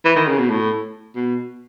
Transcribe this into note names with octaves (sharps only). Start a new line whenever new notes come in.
E3
D#3
C#3
B2
A2
B2